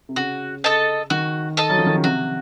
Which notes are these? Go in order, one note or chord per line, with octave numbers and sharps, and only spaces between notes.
C3
C#3 F#4
A4 D#5 A5
D#3 F#4
A4 D#5 A5
F#3
F3
D#3
C#3
C3 F#4